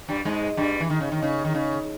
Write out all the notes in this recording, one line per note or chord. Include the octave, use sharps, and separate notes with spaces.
G2 G3
G#2 G#3
G2 G3
E3
D#3
C#3
D#3
C#3
D#3
C#3